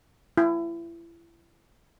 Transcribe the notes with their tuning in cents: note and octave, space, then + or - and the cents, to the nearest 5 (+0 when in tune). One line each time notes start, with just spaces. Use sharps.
E4 +30